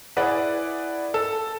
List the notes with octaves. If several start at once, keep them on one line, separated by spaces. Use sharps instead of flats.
E4 G#4 B4 D5 F#5
A4